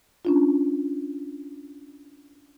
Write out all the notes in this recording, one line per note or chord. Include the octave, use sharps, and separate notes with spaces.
C#4 D4 F4